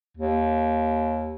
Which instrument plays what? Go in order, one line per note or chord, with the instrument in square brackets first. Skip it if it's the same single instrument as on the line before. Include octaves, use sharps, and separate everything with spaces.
[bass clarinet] D#2